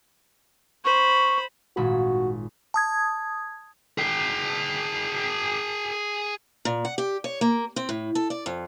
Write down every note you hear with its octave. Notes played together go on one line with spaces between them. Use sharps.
C5 B5 C#6
G#1 A#2 F#4 B5
A5 D#6 G#6
G#4 G5
A#2
F#5
G4
C#5
A#3
C4
A2
A4
D5
F2